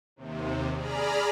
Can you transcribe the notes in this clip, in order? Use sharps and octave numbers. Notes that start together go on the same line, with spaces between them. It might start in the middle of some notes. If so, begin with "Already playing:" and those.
D#2 C3
G#4 D5 A#5 B5 F6